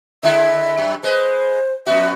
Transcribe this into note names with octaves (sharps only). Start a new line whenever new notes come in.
D3 G#3 E4 E5
F#2
G#3 B4 C5 D#5
F2 B3 F#4 E5